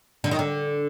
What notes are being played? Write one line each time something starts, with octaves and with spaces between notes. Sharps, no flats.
D3
D#3
D3